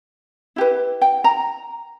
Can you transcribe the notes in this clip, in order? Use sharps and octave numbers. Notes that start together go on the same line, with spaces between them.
E4 G4 B4
G5
A#5